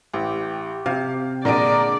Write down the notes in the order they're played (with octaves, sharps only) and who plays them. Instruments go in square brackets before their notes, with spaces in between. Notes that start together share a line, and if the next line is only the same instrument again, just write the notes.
[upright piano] A1 [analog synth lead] G4
[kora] C3 [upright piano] F5
[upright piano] A#2 A#4 D7 [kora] D3 G#3 [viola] D5 [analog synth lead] A#5